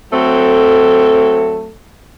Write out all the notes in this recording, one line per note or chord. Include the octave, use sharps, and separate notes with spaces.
F#3 A3 C4 A4